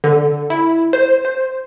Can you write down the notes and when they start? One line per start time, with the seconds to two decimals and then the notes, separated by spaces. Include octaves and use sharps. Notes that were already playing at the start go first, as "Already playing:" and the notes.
0.04 D3
0.50 E4
0.93 C5
1.25 C5